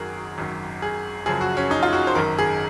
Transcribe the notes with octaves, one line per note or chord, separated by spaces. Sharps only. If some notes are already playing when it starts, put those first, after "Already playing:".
Already playing: G#1 F#2 D#3 F#4 G#4 A#4
G#1 F#2 D#3
G#4
F#1 F#2 C#3 F3 G#4
F#4
C#4
D#4
F4
F#4
C5
G#1 F#2 D#3 A#4
G#4